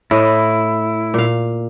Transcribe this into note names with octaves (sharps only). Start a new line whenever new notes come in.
A2 E4 D#5
A#2 F5